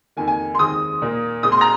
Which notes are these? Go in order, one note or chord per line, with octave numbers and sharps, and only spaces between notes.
F2 D#3 A#3 G#5
G#5
C6
D#2 D#3 G#3 C4 D#6
A#2 A#3
A#2 G#3 C4 D#6
C6
A#5